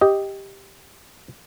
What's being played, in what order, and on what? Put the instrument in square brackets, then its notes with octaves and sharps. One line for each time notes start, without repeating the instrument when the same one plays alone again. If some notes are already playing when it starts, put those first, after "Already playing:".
[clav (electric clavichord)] G4 D#5